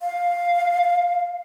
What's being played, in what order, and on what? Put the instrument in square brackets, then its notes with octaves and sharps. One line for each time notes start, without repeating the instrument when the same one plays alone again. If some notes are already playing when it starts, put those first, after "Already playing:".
[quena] F5